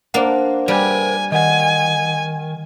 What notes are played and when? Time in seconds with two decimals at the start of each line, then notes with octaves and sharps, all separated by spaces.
0.14 A#3 D4 C5 F#5
0.68 G3 A#4 B4 G#5
1.32 D#3 D#5 F#5 G#5